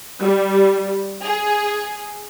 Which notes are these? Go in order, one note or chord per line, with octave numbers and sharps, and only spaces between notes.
G3
G#4